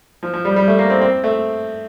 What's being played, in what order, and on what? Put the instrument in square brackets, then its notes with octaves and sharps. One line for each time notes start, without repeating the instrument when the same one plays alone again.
[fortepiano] F3
F3
G3
G3
A3
A#3
C4
C4
A3